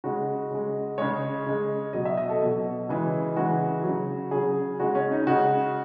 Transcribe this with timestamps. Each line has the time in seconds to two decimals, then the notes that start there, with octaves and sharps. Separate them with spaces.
0.04 C#3 G#3 F#4
0.51 C#3 G#3
0.98 C#3 G#3 C#5
1.46 C#3 G#3
1.93 B2 F#3 D#5
2.05 E5
2.17 D#5
2.29 A4
2.41 B2 F#3
2.89 C#3 E3 G#3
3.36 C#3 E3 G#3 F#4
3.84 C#3 F#3
4.31 C#3 F#3 G#4
4.80 C#3 G#3 F#4
4.95 C#4
5.12 D#4
5.27 C#3 G#3 F#4